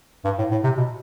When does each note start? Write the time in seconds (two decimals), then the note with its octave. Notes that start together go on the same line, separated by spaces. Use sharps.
0.25 G2
0.38 A2
0.51 A2
0.64 C3
0.77 B2